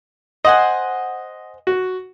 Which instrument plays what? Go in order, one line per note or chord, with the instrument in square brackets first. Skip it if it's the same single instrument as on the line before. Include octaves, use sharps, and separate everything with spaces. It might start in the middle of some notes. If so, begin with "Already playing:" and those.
[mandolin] C5 F#5 G#5 [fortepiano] D#5
[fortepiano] F#4